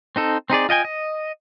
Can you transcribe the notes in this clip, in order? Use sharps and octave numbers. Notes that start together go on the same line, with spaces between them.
C4 D#4 A4
C4 D#4 G#4 D5
F4 D#5 G5 G#5
D#5